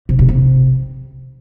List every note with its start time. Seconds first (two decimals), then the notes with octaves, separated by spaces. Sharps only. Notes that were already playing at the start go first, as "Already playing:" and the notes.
0.09 C3
0.19 B2
0.29 C3